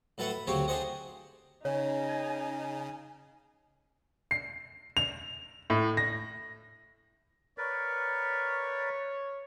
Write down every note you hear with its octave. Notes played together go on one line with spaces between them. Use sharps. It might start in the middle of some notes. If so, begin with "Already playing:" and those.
A2 F#3 A4 B4 E5 F#5
B5
D2 C#3 F#3 C4 G4 C#5
D4 G4 G#4 C5 D#5 F#5
C#3 D#4 C#5 G#5
C7
F7
A2
A#6
A#4 B4 C#5 D5